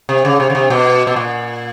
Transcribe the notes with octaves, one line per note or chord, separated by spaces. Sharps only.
C3
C#3
C3
C#3
C3
B2
B2
A#2